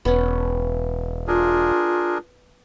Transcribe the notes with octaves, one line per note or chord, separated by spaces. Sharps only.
E1 B3 C#4
D4 F4 G#4 A#4